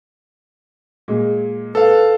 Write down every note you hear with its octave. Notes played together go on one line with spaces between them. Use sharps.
A#2 G#3
A4 B4 F5